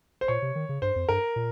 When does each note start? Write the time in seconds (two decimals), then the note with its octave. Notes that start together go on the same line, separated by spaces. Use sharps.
0.21 C5
0.28 A#2 C#5
0.42 C3
0.55 D#3
0.69 C#3
0.82 G2 C5
0.96 F2
1.09 G2 A#4
1.36 A#2